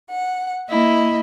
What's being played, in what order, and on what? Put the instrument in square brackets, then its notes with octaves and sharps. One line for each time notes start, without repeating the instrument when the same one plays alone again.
[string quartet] F#5
[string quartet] A#3 D#5 E5 [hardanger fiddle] E4